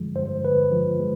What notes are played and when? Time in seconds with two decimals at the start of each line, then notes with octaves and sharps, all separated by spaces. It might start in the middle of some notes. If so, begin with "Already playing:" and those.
Already playing: G2 D3 F3 G#3
0.16 G2 C5
0.43 D3 B4
0.72 F3
1.00 G#3